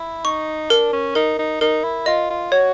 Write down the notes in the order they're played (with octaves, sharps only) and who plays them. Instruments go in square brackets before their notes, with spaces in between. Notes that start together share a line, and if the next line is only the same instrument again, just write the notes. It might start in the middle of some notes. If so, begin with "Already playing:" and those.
Already playing: [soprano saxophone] E4
[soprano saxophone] D#4 [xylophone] C#6
[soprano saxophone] D4 [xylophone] A#4
[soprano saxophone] C#4
[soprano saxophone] D#4 [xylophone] A#4
[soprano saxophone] D#4
[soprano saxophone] D#4 [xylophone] A#4
[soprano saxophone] E4
[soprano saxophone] F4 [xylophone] D#5
[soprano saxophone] F4
[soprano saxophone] F#4 [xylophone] C#5